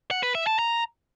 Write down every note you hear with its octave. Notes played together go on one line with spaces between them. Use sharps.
F#5
B4
E5
A5
A#5